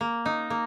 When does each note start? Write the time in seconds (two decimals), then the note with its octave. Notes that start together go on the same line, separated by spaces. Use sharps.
0.01 A#3
0.26 D#4
0.50 A#3